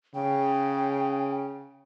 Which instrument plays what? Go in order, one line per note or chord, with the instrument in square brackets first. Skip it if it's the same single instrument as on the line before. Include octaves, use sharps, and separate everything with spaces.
[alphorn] C#3 [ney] G5